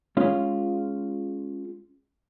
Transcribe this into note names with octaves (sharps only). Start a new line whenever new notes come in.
G#3 C#4 F4